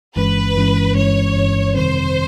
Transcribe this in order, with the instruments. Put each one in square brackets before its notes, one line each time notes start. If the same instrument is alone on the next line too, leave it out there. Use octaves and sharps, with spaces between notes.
[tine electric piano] G1 G2 E3 G#3 C#4 [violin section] B4
[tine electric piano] G1 G2 E3 G#3 C#4
[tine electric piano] G1 G2 E3 G#3 C#4 [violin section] C#5
[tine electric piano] G1 G2 E3 G#3 C#4
[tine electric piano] F2 C3 D#3 G3 C4 [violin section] C5